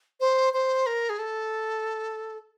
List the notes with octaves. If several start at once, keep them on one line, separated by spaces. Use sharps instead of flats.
C5
C5
A#4
G#4
A4